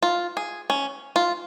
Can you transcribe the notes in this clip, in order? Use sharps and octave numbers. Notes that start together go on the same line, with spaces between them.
F4
G#4
C#4
F4